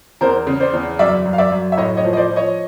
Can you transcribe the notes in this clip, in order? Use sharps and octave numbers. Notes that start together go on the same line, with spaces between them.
E2 A#4 C5
C#3
C5 D5
E2
F#2 D5 E5
F#2
F5
D5 E5
F#2
E5
A2 C#5 D#5
C#5 D#5
F3
D#5
C5 D5
F3
C#5 D#5